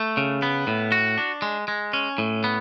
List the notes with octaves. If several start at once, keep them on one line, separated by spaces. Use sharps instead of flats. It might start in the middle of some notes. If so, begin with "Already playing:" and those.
Already playing: A3
C#3
B3
A2
F#4
D4
G#3
G#3
C#4
A2
B3